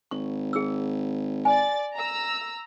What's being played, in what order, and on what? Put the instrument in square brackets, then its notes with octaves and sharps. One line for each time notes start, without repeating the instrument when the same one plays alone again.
[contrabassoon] G#1 [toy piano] C#6
[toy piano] G#4 E6
[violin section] D5 A6 [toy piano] G#5
[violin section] A#5 E6